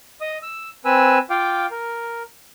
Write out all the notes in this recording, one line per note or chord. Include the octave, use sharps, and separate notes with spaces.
D#5 D#6
E6
C4 B4 G#5 E6
F4 F5 G5 D6
A#4